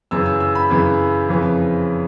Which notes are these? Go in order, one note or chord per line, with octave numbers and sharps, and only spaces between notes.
F#2 C#3 E3 E6
E6
E6
B5
F#2 C#3 E3
F2 C#3 E3